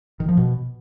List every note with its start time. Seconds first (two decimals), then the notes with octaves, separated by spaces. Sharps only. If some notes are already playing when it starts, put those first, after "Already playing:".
0.20 D#3
0.29 F3
0.37 B2